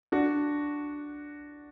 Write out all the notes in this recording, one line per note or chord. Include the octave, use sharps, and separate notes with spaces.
D4 F#4